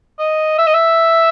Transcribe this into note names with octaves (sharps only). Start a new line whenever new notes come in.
D#5
E5
D#5
E5